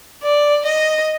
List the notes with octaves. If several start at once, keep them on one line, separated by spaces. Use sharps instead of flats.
D5
D#5